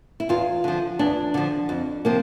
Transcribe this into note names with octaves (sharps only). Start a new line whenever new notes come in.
E4
E2 F4
D3 F3
E2 D4
D3 F3
F2
C3 F3 A#3